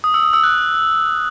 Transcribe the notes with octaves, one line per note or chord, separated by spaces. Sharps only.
D#6
E6
D#6
E6
F#6